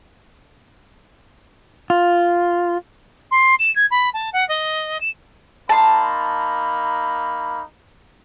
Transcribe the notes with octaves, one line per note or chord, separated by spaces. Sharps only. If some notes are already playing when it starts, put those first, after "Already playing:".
F4
C6
E7
G#6
B5
A5
F#5
D#5
E7
A#3 D#4 A5 B5 C6